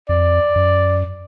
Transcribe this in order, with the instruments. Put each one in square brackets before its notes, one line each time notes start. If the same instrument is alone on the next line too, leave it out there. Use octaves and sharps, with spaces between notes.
[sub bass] F2 [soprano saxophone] D5
[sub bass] F#2